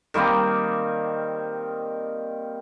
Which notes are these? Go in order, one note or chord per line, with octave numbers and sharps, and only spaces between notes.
D#3 G3 A#3 C4